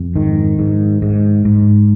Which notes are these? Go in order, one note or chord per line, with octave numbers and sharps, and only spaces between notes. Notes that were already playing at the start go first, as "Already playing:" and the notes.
Already playing: F2
G#2 D#3
G#2
G#2
G#2